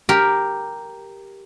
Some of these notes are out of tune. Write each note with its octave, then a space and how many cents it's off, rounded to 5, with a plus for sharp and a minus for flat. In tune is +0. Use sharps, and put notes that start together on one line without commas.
G4 +0 A#4 +0